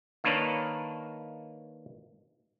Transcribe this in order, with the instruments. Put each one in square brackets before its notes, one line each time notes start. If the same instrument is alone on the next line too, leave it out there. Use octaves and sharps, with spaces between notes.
[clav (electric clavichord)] D#3 A#3 D4 B4 C#5